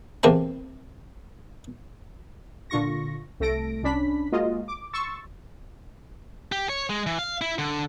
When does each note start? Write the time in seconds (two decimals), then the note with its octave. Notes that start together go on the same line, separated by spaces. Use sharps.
0.23 E2 C3 A#3 C4 A5
2.70 A#2 D3 F4 C#6 A#6
3.40 C2 A3 A4 A#6 D7
3.83 C2 C#4 D4 B5 B6
4.32 G#3 A#3 F4 F#4 D#5
4.68 D6
4.93 C6 C#6 E6 A6
6.52 G4
6.69 C#5
6.90 G#3
7.06 E3
7.19 F5
7.41 E4
7.59 D3